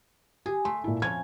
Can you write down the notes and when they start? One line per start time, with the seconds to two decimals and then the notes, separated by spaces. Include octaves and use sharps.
0.46 G4 G#4
0.65 A3 C6
0.84 A#2 E4
1.02 F2 C#4 G#6